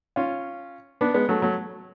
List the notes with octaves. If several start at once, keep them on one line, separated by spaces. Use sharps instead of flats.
C#4 F4
B3 D4
G#3 B3
F#3 A3
F#3 A3